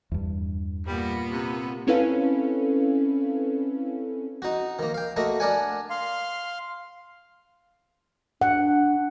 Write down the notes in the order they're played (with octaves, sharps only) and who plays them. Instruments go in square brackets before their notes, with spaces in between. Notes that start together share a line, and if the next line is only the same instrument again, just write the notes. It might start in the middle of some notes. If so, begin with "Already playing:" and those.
[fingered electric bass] E2 G2
[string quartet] A#2 B3 [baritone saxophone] G3
[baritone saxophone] C3
[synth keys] C4 C#4 E4 A4 B4 F5
[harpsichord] D#4 F#4
D#3 A#3
F5 G5
A3 A#3 F#4 D#5
D4 A#4 D5 F#5 G#5
[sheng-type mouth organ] F5 C6
[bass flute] D4 [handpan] F#5